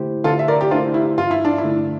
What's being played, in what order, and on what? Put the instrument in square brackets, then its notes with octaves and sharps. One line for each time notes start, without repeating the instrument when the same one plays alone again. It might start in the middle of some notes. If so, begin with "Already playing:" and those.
Already playing: [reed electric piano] D3 A3 E4 G4 C5
[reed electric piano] D3 [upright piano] F4 A4
[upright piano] E5
A#4 D5
G4
[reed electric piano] A3 E4 G4 C5 [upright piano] D4 F4
[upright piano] E4
[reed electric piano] G2 [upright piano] F4
[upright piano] E4
D4
E4
[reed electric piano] D3 A3 D4